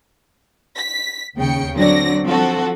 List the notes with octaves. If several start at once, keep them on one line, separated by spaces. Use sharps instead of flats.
B6
D#2 C#3 G5 C#7
D3 F#3 C4 D5 A#6
F3 C4 F#4 A4